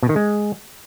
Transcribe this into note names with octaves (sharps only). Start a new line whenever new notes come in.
B2
D#3
G#3